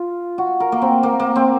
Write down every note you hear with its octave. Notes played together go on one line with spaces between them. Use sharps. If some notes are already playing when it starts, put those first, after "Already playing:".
Already playing: F4
F#4
A#4
A#3
C4
A#3
A#3
C4